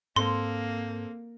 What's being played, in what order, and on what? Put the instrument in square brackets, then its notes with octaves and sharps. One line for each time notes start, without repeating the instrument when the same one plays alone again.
[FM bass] G#2 [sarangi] A#3 [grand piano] C4 A4 [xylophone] C6